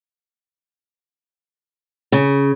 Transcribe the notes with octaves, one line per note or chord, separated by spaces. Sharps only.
C#3